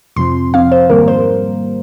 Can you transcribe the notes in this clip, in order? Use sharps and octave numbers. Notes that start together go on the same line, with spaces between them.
F2 C3 F3 C4 C6
F2 C3 F3 C4 F5
C5
G#2 D#3 G3 A#3 A#4
C5